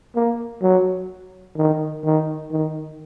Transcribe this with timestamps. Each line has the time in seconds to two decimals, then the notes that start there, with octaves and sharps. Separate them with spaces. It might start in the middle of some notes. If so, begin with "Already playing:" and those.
0.16 A#3
0.63 F#3
1.57 D#3
2.05 D#3
2.52 D#3